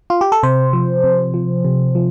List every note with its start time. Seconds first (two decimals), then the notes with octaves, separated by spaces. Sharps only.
0.10 F4
0.21 G4
0.32 A4
0.43 C3 C5
0.73 F3
1.04 C3
1.34 F3
1.64 C3
1.95 F3